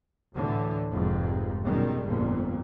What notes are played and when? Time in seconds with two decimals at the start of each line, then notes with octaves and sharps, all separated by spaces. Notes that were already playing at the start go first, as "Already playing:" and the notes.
0.34 D2 A2 D3 E3
0.92 F1 F2 G#2
1.64 F#2 B2 D#3 G3 G#3
2.06 G1 F2 A#2